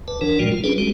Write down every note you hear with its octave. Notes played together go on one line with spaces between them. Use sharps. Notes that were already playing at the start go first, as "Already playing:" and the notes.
D2 B4 A5
F#1 E3 D4 A#4
G1 A#2 F3 G3 G#3 F#4
F4
G3 C#4 D4 G#4 A4 B4
G3 G#3 C#4 F#4 G4